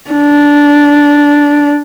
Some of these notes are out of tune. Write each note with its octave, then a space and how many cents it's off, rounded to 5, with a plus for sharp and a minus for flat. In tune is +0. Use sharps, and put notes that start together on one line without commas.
D4 -10